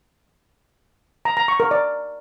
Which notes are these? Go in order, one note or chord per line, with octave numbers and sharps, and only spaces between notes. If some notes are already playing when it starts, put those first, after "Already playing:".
A#5
A#5
C#6
A#4
D5